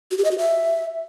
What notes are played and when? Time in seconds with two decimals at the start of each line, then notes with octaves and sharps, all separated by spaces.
0.11 F#4
0.18 G4
0.24 D#5
0.31 F#4
0.38 E5